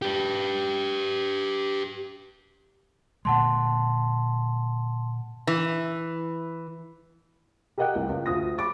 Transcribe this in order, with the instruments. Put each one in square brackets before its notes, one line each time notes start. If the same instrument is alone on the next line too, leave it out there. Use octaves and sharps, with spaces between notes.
[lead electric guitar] G4 B4
[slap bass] A#2 D3 G#3 [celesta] F#5 A5 C6
[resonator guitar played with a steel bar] E3
[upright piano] G4 A#4 D#5 F#5 G5 F#6
C2
C#2
D2 F4 D#6 A#6
B5 C#6 D6 A6